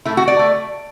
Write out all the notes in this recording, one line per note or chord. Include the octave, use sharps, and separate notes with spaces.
A2 A3 E4
F#4
D5
A3